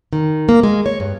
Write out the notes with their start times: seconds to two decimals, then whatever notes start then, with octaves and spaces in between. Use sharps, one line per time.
0.13 D#3
0.49 A#3
0.63 G#3
0.86 C#5
1.00 G2